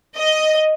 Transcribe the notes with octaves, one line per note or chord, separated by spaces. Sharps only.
D#5